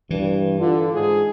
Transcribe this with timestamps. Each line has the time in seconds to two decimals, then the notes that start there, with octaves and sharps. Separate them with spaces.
0.11 G2 E3
0.60 D3 F4
0.93 G#2 G#4